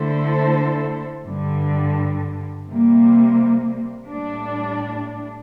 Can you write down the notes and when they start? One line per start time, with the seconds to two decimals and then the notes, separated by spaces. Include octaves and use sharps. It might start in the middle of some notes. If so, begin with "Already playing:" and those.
Already playing: D3 A3 E4 A4 C5
1.26 G2 D3 G3
2.67 C3 G3 A#3
4.09 A2 G3 D4